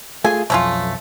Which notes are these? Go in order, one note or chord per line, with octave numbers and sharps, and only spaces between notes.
A3 F4 G#4 G#5
B1 F2 A3 C#4 F4